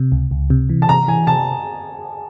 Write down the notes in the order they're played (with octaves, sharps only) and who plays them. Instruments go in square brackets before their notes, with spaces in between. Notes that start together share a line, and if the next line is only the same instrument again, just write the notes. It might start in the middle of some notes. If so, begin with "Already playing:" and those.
Already playing: [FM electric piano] C3
C#2
C#2
C3
E3
[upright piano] A5
[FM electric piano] C3 [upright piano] A#5
[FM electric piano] E3 [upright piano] G#5
[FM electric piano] C3 [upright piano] A5